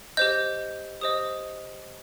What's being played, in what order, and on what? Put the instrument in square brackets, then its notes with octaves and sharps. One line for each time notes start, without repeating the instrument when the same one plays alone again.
[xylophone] G4 C5 D#5 G6
G4 C5 D#5 D#6